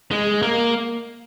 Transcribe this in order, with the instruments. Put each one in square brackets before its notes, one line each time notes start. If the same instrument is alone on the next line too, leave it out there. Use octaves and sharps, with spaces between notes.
[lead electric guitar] G#3
A#3